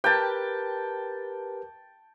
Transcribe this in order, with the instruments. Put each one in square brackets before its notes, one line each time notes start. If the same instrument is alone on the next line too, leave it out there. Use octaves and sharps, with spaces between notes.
[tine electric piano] G4 A#4 B4 [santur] G5 A5